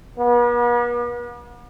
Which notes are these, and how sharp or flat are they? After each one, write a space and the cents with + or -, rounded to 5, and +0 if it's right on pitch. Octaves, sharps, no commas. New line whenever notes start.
B3 -45